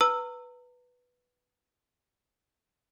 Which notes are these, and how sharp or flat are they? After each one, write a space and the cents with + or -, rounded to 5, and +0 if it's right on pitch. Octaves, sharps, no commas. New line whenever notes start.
B4 +0 A#5 -35 E6 +0